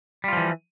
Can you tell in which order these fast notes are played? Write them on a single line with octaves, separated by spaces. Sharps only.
G3 F4 F3 E3